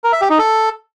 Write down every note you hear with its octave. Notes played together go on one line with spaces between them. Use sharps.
A#4
E5
G4
D#4
A4